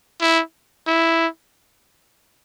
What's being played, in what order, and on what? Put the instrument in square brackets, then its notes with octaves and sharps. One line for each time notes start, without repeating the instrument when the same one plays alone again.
[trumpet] E4
E4